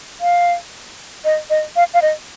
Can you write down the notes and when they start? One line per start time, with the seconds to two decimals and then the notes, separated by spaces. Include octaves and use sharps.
0.21 F5
1.25 D#5
1.50 D#5
1.76 F5
1.94 F5
2.02 D#5